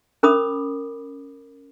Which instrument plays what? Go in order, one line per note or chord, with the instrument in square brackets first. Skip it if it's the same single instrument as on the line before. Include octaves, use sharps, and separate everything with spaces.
[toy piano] C#4 A#4 B5 D6 D#6